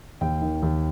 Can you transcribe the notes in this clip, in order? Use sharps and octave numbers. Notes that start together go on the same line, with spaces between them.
D#2 G5
D#3
D#2